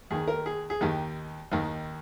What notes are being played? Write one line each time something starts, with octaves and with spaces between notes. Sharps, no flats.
D#2 D#3 G#4
A#4
G#4
G#4
D#2 D#3 G4
D#2 D#3